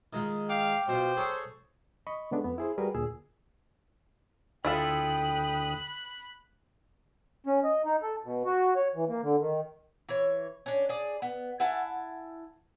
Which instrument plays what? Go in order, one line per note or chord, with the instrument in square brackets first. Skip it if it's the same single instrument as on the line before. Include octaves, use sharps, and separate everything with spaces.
[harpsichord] D#3 G#3 F4
[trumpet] F5 [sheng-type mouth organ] G5 D6
[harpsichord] B2 F4 [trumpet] C5
[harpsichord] G#4 A4 C#5
[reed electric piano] D#5 B5 C#6
C#3 G#3 A3 B3 D4
F2 B3
E4 G#4 C5
G3 F#4 G#4 A#4 B4
D2 A#2 G#4 E6
[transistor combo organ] D2 D#6 [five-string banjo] E4 F4 A4 [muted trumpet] G5 [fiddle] B5 F#6
[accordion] C#4
D#5
D#4
A4
B2
F#4
C#5
E3
A#3
D3
D#3
[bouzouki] E3 C#5
C#4 D4
G#4 D5
B3
E4 F#5 G#5 A5